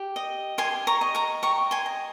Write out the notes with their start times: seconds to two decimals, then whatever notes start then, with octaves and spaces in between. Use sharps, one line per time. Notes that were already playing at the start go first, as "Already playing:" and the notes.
Already playing: G4
0.16 D#5
0.58 G4 G#5 C6
0.87 A#5 C#6
1.01 D#5
1.15 A#5 C#6
1.43 G4 A#5 C#6
1.71 G#5 C6
1.86 D#5